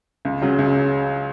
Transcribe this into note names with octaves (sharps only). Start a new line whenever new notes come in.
C#2
C#3 F#3
C#2